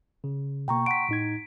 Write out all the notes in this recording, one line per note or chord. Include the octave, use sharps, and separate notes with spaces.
C#3
B2 A#3 G5 A#5 C#6
F#5 C6 B6 D7
A2 D#4 G#6